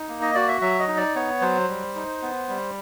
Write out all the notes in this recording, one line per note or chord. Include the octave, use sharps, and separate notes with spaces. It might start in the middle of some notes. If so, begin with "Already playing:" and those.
Already playing: D#4
A#3
D#5
F#4 D5
E5
F#3 E5
D#5
D#4
D5
B3 C#5
F#3 C5
G3
D#4
B3
G3